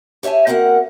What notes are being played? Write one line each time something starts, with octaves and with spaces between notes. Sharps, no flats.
G4 C#5 E5 G#5 A5
A#3 C4 F#4 A#4 F#5